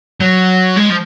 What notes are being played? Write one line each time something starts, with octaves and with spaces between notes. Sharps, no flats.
F#3
G#3
F3